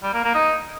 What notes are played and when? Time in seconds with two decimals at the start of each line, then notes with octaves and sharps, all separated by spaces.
0.04 G3
0.14 A#3
0.24 A#3
0.35 D#4